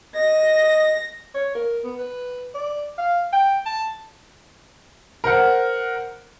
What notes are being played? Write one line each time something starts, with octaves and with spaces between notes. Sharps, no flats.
D#5 A#6
C#5
A#4
B3
B4
D5
F5
G5
A5
A#4 C5 F#5